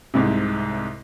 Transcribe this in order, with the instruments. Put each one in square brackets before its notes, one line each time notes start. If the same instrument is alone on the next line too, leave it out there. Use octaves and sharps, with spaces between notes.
[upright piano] C2 G#2 C3